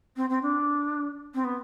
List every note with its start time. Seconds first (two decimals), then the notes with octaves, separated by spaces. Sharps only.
0.16 C4
0.29 C4
0.42 D4
1.34 C4
1.44 B3